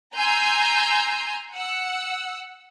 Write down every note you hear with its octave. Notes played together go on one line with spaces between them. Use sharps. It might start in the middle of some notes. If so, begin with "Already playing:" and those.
G#5 A#5 C6 E6 G6
F#5 E6